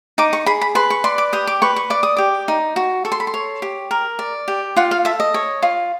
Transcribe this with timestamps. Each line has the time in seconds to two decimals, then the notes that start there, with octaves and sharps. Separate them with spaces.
0.18 D#4 D6
0.33 C#6
0.46 G#4 B5
0.61 B5
0.75 B4 C6
0.90 C#6
1.04 D5 C6
1.18 D6
1.33 G4 D#6
1.47 D6
1.62 B4 C#6
1.76 C#6
1.90 D5 D6
2.03 D#6
2.17 G4 D6
2.48 D#4
2.76 F#4
3.05 A4 C#6
3.12 C6
3.20 B5
3.27 C6
3.34 C#5
3.62 G4
3.91 A#4
4.19 D5
4.48 G4
4.77 F4 F#5
4.91 F5
5.05 A4 E5
5.20 D#5
5.34 C#5
5.62 F4